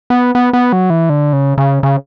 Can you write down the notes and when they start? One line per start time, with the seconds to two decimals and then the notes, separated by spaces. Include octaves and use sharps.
0.10 B3
0.35 B3
0.53 B3
0.73 F#3
0.90 E3
1.10 D3
1.33 C#3
1.58 C#3
1.83 C#3